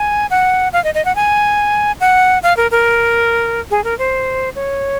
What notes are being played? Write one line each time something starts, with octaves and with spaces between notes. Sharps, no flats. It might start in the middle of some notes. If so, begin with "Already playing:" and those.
Already playing: G#5
F#5
F5
D#5
D#5
F#5
G#5
F#5
F5
A#4
A#4
G#4
A#4
C5
C#5